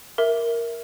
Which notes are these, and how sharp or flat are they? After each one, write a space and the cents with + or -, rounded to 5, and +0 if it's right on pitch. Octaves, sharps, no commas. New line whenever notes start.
A#4 +0 E5 +0